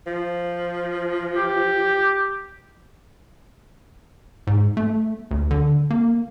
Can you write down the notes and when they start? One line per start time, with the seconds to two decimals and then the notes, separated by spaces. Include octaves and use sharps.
0.07 F3
1.36 G4
4.47 G#2
4.77 A3
5.31 D2
5.51 D3
5.90 A#3